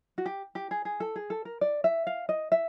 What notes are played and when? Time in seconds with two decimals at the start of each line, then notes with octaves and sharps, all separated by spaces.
0.18 F#4
0.26 G4
0.55 G4
0.71 G#4
0.85 G#4
1.00 A4
1.16 G#4
1.30 A4
1.45 A#4
1.61 D5
1.84 E5
2.07 F5
2.29 D#5
2.52 E5